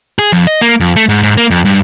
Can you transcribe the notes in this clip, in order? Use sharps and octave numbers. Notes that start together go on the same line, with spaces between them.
G#4
F2
D#5
A#3
F2
A3
G#2
G#2
A#3
F2
G2